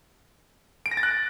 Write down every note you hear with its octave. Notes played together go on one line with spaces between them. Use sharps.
D7
A#6
A6
F#6